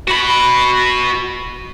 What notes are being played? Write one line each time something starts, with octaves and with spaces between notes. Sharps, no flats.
F#4 B5